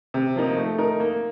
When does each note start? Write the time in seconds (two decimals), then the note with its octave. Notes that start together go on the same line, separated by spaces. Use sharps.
0.14 C3
0.36 F3 A#3 D#4
0.56 A3
0.78 D#4 A#4
1.00 A#3